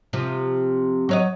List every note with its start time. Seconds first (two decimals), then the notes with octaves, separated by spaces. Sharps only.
0.13 C3 F3
1.09 F#3 C#5 D#5